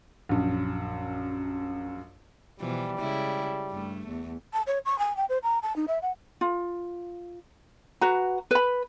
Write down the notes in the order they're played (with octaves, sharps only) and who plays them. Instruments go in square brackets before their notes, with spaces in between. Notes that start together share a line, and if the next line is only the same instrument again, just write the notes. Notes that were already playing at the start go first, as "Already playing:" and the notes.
[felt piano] A#1 F#2
[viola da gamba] B2 E3 F3 [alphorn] G3
[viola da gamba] C#3 G#3 E4
G2 A3
E2
[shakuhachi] A5
C#5
C#6
G#5
G5
C5
A#5
A5
D#4
E5
F#5
[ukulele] F4
F#4 B4 A#5
B4 B5